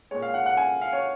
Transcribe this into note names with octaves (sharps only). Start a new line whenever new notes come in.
A#2 G#3 C#5
F5
F#5
F#5
G#5
F5
C#5